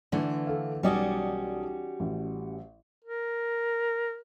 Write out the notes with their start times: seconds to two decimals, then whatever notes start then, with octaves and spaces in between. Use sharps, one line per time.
0.12 D3 E3 A3 D4
0.47 A4 F5
0.83 B1 G3 C#4 F#4 D5 D#6
2.00 A1
3.05 A#4